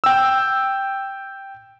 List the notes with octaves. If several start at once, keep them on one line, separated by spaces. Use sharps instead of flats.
G5 E6